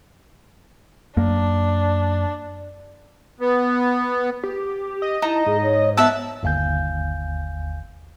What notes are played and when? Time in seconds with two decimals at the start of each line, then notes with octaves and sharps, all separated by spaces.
1.17 F#2 A#3 D4
3.40 B3
4.44 G4
5.02 D#5
5.22 D#4 E4 A5 A#5
5.46 G#2 G#4
5.62 C#5
5.97 B3 E5 F#5 A5 E6
6.43 G1 D#2 F5 G#5 G6